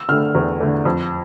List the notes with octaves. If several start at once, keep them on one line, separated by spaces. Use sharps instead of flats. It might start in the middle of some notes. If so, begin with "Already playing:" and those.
Already playing: E6
D3 A3 F6
E2
D3 A3
F2